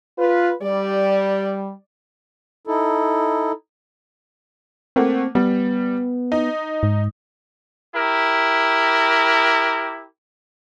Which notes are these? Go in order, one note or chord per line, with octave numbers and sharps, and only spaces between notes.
F4 B4
G3 D5
D#4 E4 A4
A3 A#3 C4 F#5
G3 B3
D#4
G#2
E4 G4 A#4